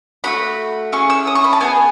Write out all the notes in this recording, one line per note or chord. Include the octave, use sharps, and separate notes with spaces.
A3 D#4 F#4 B5
C#4 E4 G#4 C#6
E6
D#6
C#6
B5
A5
B3 D#4 G#4 G#5